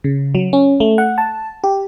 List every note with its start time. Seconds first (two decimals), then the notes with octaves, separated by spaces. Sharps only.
0.04 C#3
0.35 F#3
0.53 C#4
0.80 A3
0.98 F#5
1.18 A5
1.64 G4